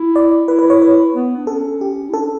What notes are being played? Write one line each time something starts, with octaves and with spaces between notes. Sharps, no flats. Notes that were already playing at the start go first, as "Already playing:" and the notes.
Already playing: E4
D5
E4 B4
B4
C#5
B4
B3
D4
C#4 A4
G4
E4
D4 A4